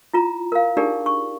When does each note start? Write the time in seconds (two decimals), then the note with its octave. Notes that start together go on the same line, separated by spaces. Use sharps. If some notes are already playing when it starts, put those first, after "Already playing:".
0.13 E4 F4 A#5
0.52 A#4 F5
0.77 D4 D#4 G4 G#4 A#4 D5
1.06 C#6